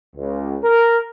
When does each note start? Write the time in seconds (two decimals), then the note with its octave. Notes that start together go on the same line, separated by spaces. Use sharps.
0.15 C#2
0.64 A#4